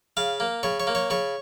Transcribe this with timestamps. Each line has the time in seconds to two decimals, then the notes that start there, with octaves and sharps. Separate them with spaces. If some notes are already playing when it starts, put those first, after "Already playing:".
0.17 C#3 F5
0.40 A#3
0.63 C#3 C#5
0.80 C#5
0.87 A#3
0.95 C#5
1.10 C#3 C#5